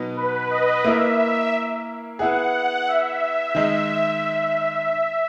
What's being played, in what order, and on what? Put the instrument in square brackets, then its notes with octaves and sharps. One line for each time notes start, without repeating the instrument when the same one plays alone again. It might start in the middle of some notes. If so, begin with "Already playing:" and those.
Already playing: [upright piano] B2 F#3 B3 D#4
[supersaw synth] B4
D#5
[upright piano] A#3 E4 A#4 [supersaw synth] E5
[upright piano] B3 E4 G#4 [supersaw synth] F#5
[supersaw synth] E5
E5
[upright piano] D#3 G#3 D#4